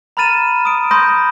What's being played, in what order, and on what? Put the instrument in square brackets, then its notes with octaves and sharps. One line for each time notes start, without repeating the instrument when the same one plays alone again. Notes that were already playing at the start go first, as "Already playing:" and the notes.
[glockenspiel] A#5 B5 F6 A6 D#7 E7
D#6 D7
B5 C6 D#6 G6 A#6